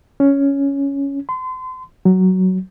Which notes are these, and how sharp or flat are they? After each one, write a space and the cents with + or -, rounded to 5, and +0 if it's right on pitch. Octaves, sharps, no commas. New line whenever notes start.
C#4 +5
C6 -35
F#3 +10